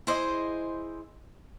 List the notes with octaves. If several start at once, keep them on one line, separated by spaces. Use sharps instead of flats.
E4 G#4 C5 D#5